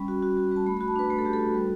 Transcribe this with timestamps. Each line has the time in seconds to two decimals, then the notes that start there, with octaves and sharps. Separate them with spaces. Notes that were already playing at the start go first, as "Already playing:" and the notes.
Already playing: G3 C#4 B5
0.08 F#4
0.23 F#4
0.37 F#4
0.52 G3 A5
0.66 A3 B5
0.77 B5
0.81 F#4
0.88 A5
0.96 D4 B4
1.10 A3 B4
1.18 A4
1.25 A3 G4
1.33 A4
1.39 F#4
1.54 G3